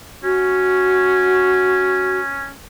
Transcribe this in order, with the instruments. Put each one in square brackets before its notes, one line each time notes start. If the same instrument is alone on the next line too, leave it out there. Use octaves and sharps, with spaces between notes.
[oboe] C#4 [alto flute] F#4